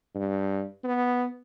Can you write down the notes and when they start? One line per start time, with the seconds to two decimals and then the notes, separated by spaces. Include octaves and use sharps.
0.15 G2
0.84 B3